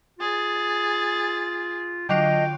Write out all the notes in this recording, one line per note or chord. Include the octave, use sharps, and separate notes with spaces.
F4 G#4 A6
D3 F#3 F4 D#5 G5